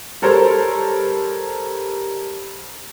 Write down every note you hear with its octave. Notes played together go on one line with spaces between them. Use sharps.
G3 A4 A#4 C5 C#5